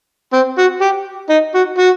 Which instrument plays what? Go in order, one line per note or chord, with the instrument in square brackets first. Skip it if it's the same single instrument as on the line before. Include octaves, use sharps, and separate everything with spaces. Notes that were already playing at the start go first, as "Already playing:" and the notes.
[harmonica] C4
F#4
G4
D#4
F#4
F#4